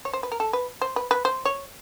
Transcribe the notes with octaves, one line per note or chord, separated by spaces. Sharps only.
C#5
C5
B4
A#4
A4
B4
C5
B4
B4
C5
C#5